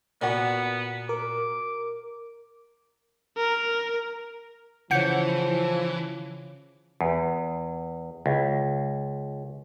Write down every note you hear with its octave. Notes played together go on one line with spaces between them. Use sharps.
A#2 B3 F#4 D5 G#5
A#4 D6
A#4
C#3 E3 F3 C#5 F#5 G6 C#7
E2
C#2